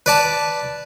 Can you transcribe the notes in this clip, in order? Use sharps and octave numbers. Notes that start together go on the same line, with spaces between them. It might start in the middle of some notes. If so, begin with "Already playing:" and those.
B4 D5 A5